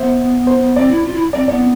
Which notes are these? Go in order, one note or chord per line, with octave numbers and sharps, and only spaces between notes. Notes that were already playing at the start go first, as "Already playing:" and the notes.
Already playing: B3 C5 E5
C5
C4 D5
E4
F4
E4
C4 D5
B3 D5